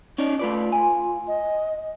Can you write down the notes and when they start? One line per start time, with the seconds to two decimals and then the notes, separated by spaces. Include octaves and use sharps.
0.18 C#4 D#4 D5
0.39 A3 F4 B4 D5
0.73 G#5
1.27 D#5